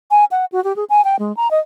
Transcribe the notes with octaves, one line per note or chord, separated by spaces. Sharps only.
G#5
F#5
F#4
G4
G#4
G#5
G5
G#3
A#5
D#5